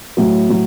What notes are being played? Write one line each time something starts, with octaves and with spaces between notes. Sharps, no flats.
A2 F#3
A2 F#3